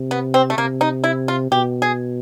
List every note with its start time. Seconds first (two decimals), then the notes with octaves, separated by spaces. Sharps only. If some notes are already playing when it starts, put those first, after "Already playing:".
Already playing: C3
0.11 B3
0.34 C4
0.50 A3
0.58 C3 A#3
0.81 D#4
1.04 E4
1.28 F4
1.52 B2 G4
1.82 G#4